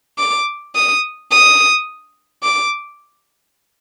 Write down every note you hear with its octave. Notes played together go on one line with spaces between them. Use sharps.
D6
D#6
D#6
D6